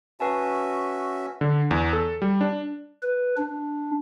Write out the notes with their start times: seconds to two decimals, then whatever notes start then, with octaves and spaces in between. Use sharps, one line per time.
0.20 C#4 F#4 B4 E5 G#5 A5
1.41 D3
1.71 E2
1.93 A4
2.22 G3
2.41 D4
3.03 B4
3.37 D4